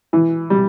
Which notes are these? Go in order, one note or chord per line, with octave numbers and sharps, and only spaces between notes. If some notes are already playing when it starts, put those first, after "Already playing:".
E3
G3